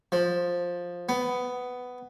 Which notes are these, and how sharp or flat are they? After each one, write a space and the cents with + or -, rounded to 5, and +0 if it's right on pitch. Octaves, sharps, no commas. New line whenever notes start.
F3 +10
B3 +10